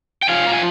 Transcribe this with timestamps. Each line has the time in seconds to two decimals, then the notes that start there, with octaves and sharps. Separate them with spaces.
0.23 G5
0.28 F3 F5 G#5
0.47 A#5
0.53 G#5